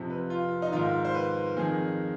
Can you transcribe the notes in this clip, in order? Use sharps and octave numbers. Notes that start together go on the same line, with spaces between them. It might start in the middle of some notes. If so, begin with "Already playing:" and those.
Already playing: F2 C3 F3
B4
F4
D#4
G#2 D#3 F4
C5
B4
F2 D#3 G#4